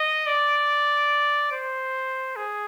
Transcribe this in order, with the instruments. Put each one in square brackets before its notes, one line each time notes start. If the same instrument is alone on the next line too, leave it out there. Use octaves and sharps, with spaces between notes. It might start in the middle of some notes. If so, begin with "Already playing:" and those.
Already playing: [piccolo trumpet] D#5
D5
C5
G#4